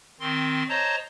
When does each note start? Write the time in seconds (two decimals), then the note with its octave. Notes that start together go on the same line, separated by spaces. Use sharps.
0.20 D#3 C4 C6
0.69 C5 C#5 D#5 A5 A#5